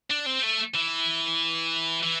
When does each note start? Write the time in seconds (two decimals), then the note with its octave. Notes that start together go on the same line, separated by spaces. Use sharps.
0.10 D4
0.26 C4
0.43 A3
0.75 E3
2.03 E3